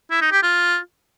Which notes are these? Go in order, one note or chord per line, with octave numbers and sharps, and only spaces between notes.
E4
D#4
G4
F4